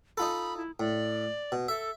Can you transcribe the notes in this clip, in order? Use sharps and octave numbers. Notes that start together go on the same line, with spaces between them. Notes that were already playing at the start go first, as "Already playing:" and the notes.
D#4 F4 A4 B5
E4
A2 D5
B2
A4 E5